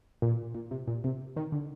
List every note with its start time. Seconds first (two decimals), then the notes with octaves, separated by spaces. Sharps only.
0.22 A#2
0.55 A#2
0.71 C3
0.88 A#2
1.04 C3
1.36 D#3
1.52 D3